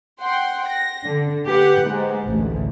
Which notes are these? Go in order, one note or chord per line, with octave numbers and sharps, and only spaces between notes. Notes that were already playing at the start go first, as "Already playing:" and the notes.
F#5 G5 C6
A#6
D3
G4 B4 F#5
G#2 G#3
A1 D2